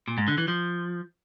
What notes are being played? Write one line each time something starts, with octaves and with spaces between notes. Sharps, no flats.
A#2
G#2
D3
E3
F3